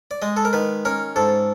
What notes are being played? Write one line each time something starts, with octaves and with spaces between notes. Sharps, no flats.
D5
G#3 D#5
A4
A#4
D#3 B4
C#4 A#4
G#2 A4